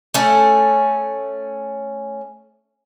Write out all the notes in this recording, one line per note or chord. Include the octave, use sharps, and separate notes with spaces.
A3 C#4